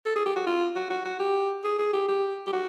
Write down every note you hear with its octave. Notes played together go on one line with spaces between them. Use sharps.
A4
G#4
G4
F#4
F4
F#4
F#4
F#4
G4
G#4
G#4
G4
G4
G4
F#4